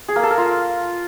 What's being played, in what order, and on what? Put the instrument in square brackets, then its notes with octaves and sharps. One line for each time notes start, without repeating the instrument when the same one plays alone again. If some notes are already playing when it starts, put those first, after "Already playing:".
[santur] G#4
A#3
A4
A#4
F4